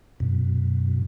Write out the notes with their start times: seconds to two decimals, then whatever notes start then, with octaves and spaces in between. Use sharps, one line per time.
0.20 F#2 B2